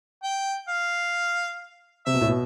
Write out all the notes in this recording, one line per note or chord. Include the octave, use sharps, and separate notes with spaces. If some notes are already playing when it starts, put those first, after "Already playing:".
G5
F5
C3 E5
B2
A2
B2